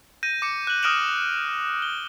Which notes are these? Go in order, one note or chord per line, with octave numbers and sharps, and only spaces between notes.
G6 A#6 D#7
D6 C#7
F#6 F#7
D#6 F6 A#6 D7 E7 F#7
G7